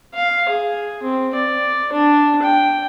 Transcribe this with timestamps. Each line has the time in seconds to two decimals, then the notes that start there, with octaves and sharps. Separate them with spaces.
0.15 F5
0.49 G#4
1.03 C4
1.35 D5
1.93 D4
2.43 G5